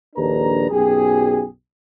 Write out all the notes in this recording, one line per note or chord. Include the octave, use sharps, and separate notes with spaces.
A#1 D#2 D4 A4 B4 A#5
B1 F#2 G4 G#4